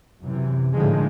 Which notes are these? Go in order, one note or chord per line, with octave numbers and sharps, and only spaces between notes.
F#2 C3 E3
A2 D3 D#3 F3 G#3